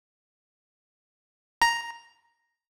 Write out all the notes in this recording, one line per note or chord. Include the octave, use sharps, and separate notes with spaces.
A#5